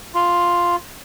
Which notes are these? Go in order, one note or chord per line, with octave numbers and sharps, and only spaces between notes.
F4